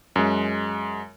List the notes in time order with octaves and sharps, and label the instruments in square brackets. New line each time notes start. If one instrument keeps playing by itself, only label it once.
[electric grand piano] F#2 G#3